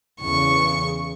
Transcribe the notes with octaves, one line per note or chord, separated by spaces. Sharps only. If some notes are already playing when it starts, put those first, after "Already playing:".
E2 C#3 C#6